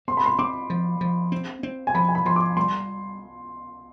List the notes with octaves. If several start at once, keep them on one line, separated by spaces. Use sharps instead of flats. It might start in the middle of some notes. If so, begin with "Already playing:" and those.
C4 C6
B5
C6
C4 D6
F3
F3
C4
C4
G#5
F3 B5
G#5
B5
F3 C6
D6
G3 C6